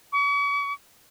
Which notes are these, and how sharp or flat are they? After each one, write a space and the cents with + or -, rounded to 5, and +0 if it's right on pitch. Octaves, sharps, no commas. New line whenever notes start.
C#6 +45